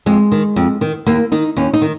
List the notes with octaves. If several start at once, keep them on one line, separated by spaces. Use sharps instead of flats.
F2 G#3
D#3
F2
D#3
D#2 A#3
D#3 D#4
D#2 C#4
D#4
D#3